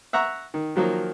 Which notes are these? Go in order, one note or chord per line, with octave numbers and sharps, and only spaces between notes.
E5 F#5 A#5 C#6
D#3
D#3 F3 F#3 A#3